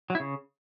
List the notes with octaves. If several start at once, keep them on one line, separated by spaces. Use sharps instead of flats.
F#3
E4
C#3